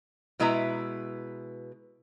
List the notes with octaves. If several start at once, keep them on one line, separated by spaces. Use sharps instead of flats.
B2 G#3 E4 B4 E5 A#5